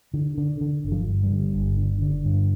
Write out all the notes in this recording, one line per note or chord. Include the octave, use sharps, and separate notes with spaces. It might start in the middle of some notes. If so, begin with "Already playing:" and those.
D3
D3
D3
G1
F3
G2
G3
D3
G1
D3
D3
G2